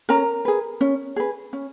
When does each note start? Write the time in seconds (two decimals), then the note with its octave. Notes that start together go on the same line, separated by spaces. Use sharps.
0.09 C#4 A#4 A#5
0.45 G#4 B4
0.81 C#4
1.16 G#4 B4
1.53 C#4